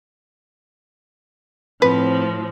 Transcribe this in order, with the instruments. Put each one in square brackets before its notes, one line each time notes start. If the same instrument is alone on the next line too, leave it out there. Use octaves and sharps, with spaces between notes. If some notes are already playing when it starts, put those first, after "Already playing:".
[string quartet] A2 F3 [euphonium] C4 [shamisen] B4